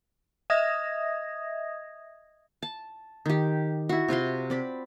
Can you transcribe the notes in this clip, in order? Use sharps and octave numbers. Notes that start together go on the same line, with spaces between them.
D#5 E5 D#6 G#6 A#6
A5
D#3 G4
E4 F#4
C3 F4 F#4 C6
C4 D5 B5